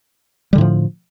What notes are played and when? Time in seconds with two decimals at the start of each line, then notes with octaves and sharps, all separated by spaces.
0.53 G3
0.55 D3
0.58 A2
0.61 F3